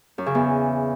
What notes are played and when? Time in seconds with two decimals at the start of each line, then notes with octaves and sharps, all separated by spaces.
0.18 F#2
0.26 C#3
0.35 E2